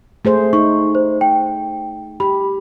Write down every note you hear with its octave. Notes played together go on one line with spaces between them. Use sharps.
A3 G#4 C5
D#4 C#6
C5
G5
G4 B5